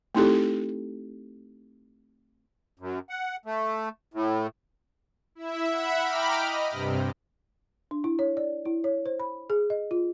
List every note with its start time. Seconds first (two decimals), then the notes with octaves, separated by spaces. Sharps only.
0.15 A3 C4 D#4 E4 G4 A4
2.79 F#2
3.10 F#5
3.46 A3
4.14 A2
5.35 E4 E5
5.67 E5 F#5 B5
6.01 G5 A#5 B5 D6 F6
6.34 D#5
6.71 G2 C3
7.91 D4
8.04 E4
8.19 C#5
8.37 D5
8.65 E4
8.84 C#5
9.06 C5
9.20 B5
9.50 G#4
9.70 D#5
9.91 F4